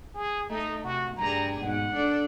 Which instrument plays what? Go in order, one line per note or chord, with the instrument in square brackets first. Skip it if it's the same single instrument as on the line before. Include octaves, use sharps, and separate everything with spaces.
[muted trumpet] G#4
[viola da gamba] A3 [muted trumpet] D#4
[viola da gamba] C3 [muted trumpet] F#4
[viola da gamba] G2 G3 G#4 [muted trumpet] A#5
[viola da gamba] G#2 B2 [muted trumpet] F#5
[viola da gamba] D4 A4 D5